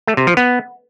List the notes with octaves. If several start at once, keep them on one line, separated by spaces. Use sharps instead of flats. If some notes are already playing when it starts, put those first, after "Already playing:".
A3
C3
F3
B3